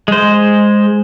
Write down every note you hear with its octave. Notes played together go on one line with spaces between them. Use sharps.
G#3 C5